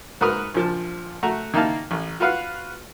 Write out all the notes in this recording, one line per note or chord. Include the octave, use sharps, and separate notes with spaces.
G#2 F#4 A#4 B4 D#6 F6
A#1 F3 A5
A3 F#4 F#5 A#5
D#3 A#3 D#4 E4 F5 A5
A1
F4 F#4 B4 F5 F#5